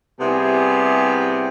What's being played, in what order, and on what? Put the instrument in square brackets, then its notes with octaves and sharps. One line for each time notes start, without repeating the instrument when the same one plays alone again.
[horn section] C3 G3 B3 E4 G4 G#4